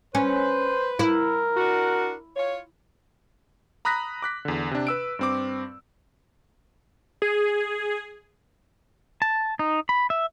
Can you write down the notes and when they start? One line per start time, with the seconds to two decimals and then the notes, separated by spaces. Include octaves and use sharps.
0.15 C#4 B4 C5
0.99 E4 A#4
1.57 D4 F#4
2.36 F4 C#5
3.85 A#5 B5 D#6 F#6 A#6 B6
4.22 D6 F#6 B6
4.45 E2 D3
4.71 C3 D4
4.87 B4 E6 D7
5.19 G2 C4 D6
7.22 G#4
9.22 A5
9.59 D#4
9.89 B5
10.10 E5